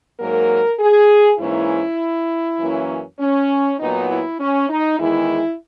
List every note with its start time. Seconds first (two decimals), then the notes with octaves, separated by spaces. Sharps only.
0.20 G#2 F#3 A#3 A#4
0.80 G#4
1.39 G#2 E3 A#3 C#4 E4
2.60 F#2 E3 A#3 C#4
3.19 C#4
3.79 A#2 F#3 B3 D#4
4.10 E4
4.40 C#4
4.69 D#4
4.99 E2 D#3 G#3 E4